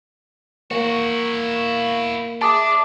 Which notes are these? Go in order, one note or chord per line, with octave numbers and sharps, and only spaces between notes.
A#3 E4 F#4 C#6
D4 G#4 E5 A5 D6 D#6